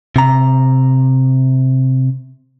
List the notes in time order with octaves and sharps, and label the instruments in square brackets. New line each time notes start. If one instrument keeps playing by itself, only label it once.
[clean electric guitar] C3 A#5